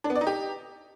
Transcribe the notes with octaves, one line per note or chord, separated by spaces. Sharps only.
D4
B3
D5
D#4
G4